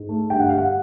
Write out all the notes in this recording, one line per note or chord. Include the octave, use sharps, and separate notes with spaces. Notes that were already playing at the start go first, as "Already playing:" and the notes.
Already playing: G#2
A3
G2 G5
F#5
G3 F5
F#5